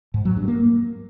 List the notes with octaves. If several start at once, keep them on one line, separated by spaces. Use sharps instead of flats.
G#2
F#3
G2
A#3